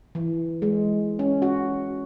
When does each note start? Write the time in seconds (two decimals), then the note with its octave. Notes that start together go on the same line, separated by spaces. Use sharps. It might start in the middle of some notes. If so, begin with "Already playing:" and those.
0.15 E3
0.62 G#3
1.19 C#4
1.42 F#4